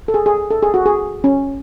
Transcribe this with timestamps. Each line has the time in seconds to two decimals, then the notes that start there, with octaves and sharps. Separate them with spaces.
0.08 A4
0.14 G#4
0.26 G#4
0.51 A4
0.62 G#4
0.74 F#4
0.86 G#4
1.24 C#4